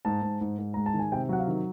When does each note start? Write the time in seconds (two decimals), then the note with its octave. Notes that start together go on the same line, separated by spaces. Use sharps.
0.05 G#2 A5
0.22 G#2
0.41 G#2
0.58 G#2
0.74 G#3 A#5
0.86 A5
0.94 D#3
0.99 G#5
1.12 C3 G5
1.29 F#3 F#5
1.39 F5
1.47 D#3